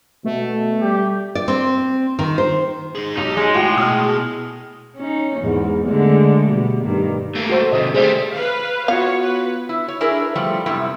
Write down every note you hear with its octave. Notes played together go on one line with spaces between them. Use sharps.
B2 A3
G3 G4
D5
C4
D#3
C5
D#4 G#4
B1 D#4 G4
G#3 D#4
A2 F4 F#4 G5
B2 D#6 F6
C#4 D#4
E2 G#2
D3 G#3 A3
B2 G3
G2 D#3
A3 A#3
F#4 A4 C5
C3 D#3 D#5 E5
G3 A3 G#4 C5 E5
B4 F5
B3 F4 F#4 C#5 F5
B4
E4
C#5
D4 E4 G#4 A#4 B4
F3 G3 A3
F#2 C3 G3 B3 E4